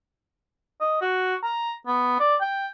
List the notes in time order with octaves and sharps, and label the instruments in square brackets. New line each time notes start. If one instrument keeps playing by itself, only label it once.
[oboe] D#5
F#4
A#5
B3
D5
G5